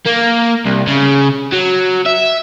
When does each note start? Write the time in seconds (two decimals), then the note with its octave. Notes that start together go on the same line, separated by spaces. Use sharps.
0.06 A#3
0.66 C2
0.87 C#3
1.52 F#3
2.06 E5